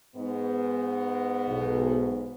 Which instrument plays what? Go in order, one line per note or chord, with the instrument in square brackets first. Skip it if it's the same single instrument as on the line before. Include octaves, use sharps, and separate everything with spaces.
[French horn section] G#2 B3
[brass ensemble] B1